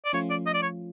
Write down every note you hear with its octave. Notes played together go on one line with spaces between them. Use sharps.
D5
F3 A3 C#4 F4 C#5
D5
D#5
D5
C#5